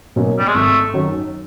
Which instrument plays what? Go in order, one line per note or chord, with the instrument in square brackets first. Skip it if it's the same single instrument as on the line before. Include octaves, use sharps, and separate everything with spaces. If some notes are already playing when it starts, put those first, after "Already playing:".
[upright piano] B2 F#3 A#3 C#4
[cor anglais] G3
G#3
[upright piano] G#1 [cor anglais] A3
[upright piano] F#2 D#3 F#3